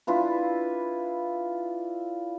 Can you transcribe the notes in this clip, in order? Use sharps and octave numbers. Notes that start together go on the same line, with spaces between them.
D4 E4 F4 B4